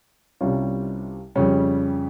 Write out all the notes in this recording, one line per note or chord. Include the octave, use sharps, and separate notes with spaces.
C2 C3 G3 C#4 F4
F2 C#3 G3 C#4